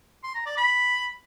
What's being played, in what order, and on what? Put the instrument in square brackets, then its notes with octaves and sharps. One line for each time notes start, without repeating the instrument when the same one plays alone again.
[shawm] C6
A#5
D5
B5